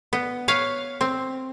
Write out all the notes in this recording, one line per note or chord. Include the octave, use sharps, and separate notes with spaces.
B3
B4 C#5 F5
C4